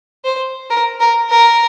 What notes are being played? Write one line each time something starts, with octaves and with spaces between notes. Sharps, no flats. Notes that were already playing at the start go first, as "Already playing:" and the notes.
C5
A#4
A#4
A#4